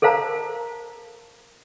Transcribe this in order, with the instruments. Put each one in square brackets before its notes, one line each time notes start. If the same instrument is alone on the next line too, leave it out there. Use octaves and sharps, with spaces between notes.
[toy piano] A4 A#4 C5 F5 A5 A#5